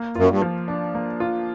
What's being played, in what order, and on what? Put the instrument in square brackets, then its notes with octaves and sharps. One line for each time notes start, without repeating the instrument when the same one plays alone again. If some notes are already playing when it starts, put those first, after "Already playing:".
Already playing: [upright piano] A#3
[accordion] F#2 [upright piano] F4
[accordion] G2
[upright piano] F3
D4
A#3
F4